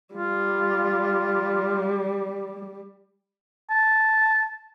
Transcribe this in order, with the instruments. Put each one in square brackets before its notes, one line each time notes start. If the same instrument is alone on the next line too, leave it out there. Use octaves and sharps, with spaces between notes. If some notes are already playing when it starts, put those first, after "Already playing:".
[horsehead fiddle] G3 [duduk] F4
[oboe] A5